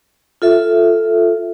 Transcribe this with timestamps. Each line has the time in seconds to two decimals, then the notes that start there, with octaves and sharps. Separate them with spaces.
0.42 F4 A4 E5